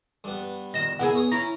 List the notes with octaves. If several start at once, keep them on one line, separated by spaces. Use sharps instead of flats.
G2 B3
F2 D#3 D#5 A#6 E7
E2 B3 E4 G4 G#4 A#4
C#5 D#6
C#4 E4 A#5